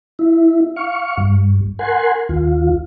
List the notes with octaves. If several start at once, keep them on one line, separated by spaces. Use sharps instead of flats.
E4
F5 C#6
G2
A#4 F#5 G#5 C6
D#2 F4